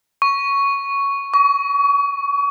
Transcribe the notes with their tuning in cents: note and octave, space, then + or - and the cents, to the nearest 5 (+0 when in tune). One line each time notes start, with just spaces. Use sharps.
C#6 +5
C#6 +35